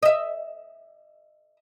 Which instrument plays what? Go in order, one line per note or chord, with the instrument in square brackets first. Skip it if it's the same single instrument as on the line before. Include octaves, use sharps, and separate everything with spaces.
[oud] D#5 E5